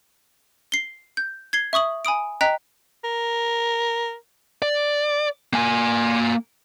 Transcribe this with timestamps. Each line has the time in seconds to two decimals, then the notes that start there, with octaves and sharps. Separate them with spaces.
0.72 C7 G7
1.17 G6
1.53 G#6 C7 G7
1.73 E5 C#6 D#6 F#7
2.05 G#5 B5 D#6 D7
2.41 D#5 G5 A#5 F#6 B6
3.04 A#4
4.62 D5
5.53 A#3 G#5